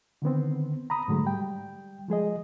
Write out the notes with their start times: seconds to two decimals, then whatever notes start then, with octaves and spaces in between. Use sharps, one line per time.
0.22 D3 D#3 B3 C4
0.90 A#5 B5 D#6
1.08 G#2 D3 F#3 G#3 A3
1.25 G3 G5
2.08 F3 G#3 G#4 D#5